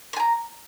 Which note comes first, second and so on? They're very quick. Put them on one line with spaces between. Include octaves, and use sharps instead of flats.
C6 G#5 A#5